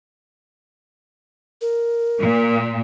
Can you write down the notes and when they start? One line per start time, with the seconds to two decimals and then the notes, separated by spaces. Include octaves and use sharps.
1.61 A#4
2.20 A#2